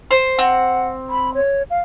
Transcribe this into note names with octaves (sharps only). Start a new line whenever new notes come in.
C5
C4 F#5
B5
C#5
F5